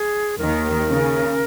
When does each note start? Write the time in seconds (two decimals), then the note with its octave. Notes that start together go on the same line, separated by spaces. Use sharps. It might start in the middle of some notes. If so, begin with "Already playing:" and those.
Already playing: G#4
0.38 D#2 D#3 A#4
0.87 C#3